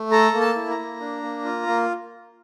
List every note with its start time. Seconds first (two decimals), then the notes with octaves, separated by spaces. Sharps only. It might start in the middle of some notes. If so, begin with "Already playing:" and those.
Already playing: A3
0.11 A4 A#5
0.33 A#3
0.41 A5
0.56 E4
0.71 A#5
0.78 A#3
1.00 D4
1.22 A#3
1.44 F4
1.67 A#3